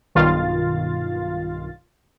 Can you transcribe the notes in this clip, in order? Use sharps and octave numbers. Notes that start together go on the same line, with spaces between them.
B1 G2 D#3 F4 F5 A6